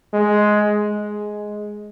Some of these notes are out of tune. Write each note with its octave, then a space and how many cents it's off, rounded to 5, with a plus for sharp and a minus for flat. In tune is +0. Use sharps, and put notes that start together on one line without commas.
G#3 +10
G#3 +5